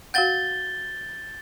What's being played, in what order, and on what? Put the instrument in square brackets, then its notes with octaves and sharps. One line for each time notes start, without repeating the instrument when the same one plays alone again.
[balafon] F#4 F5 F#5 [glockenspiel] G6 A6 G7